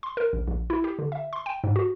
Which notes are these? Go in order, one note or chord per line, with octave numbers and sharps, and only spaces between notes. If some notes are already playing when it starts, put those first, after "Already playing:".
C6
A#4
A#1
A#1
E4
G4
D3
E5
C6
G5
G#2
F#4